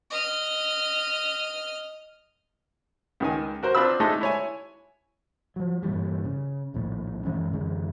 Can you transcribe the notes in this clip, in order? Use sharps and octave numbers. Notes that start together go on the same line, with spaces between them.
D#5 F6
C#2 D#3 G#5
F#4 A#4 C5
C4 D4 F4 B5 E6
G#3 A3 D4 D#4 A4
E4 C#5 G#5
F3 F#3
G2 A#2 E3 G3
C#3
D#1 A#1 A2
F#2 E3 G#3 C#4
F#2 D3 E3 G#3